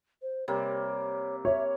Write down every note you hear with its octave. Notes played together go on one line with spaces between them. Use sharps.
C5
C3 G3 A#3 C#5
C#5 E5